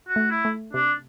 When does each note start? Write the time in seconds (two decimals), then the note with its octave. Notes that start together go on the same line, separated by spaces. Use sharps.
0.08 F#4
0.16 A3
0.30 E4
0.45 A3
0.73 C3 D4